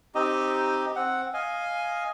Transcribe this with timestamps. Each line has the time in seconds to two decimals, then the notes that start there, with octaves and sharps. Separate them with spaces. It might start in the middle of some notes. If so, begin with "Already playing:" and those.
0.15 C4 D#4 G4 D#5
0.96 C4 F#5
1.34 D#5 F5 G#5